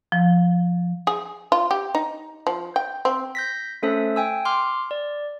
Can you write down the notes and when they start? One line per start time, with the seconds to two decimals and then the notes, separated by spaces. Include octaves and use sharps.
0.12 F3
1.07 G#4
1.52 F4
1.71 G4
1.95 D#4
2.47 F3
2.76 G5
3.05 C4
3.35 G6 A#6 B6
3.83 A3 C#4 A4 C5 E5 A5
4.16 G5 G#5 E6
4.45 C6 D6 F6
4.91 D5